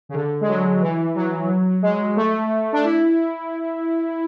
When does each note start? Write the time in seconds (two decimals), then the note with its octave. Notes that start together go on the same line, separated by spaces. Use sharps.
0.09 C#3
0.14 D3
0.41 G#3
0.48 F#3
0.81 E3
1.15 F#3
1.82 G#3
2.16 A3
2.73 D4
2.84 E4